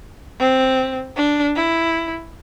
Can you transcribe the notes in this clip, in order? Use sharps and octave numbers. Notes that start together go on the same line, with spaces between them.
C4
D4
E4